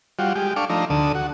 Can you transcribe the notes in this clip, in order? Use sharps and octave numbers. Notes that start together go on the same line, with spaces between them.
G3 F4 F#4
G#3 G4
D4 A4 F5 C#6 D6
F3 A3 D4 D#4 A#5
D2 D3 A4 D#6
F#4